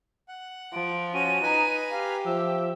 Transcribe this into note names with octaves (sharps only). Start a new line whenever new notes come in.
F#5
F3 D7
C#4 F#4 D#7
D#4 B4 G#5 A#5
G4 F5
F3 E5 E6